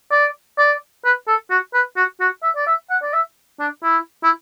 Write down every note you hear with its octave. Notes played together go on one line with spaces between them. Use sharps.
D5
D5
B4
A4
F#4
B4
F#4
F#4
E5
D5
E5
F#5
D5
E5
D4
E4
E4